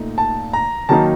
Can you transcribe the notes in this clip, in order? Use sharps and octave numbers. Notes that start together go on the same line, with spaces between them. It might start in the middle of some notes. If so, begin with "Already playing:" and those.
Already playing: A#2 A3 D#4
A5
A#5
D#3 F#3 A#3 D#4 A5